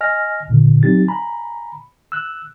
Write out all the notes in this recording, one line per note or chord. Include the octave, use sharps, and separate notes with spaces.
D#5 G#5 F6 A#6
G#1 A#2 D3
F#3 C4 D#4 G4 A6
G#5 A#5 B5
E6 F#6